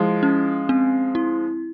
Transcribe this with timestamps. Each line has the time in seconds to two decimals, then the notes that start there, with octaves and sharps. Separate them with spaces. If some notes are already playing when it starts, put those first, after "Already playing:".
Already playing: F3 G#3 E4
0.23 C#4
0.69 C4
1.15 E4